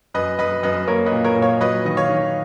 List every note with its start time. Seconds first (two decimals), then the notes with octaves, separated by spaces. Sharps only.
0.14 F#2 B4 D#5
0.39 F#2 B4 D#5
0.63 F#2 B4 D#5
0.88 A#3 A#4 C#5
1.06 B4 D#5
1.12 A#2
1.24 A#4 C#5
1.36 A#2
1.42 C#5 F5
1.61 F#3 B4 D#5
1.85 D#3 D#5
1.97 C#5 F5
2.09 D#3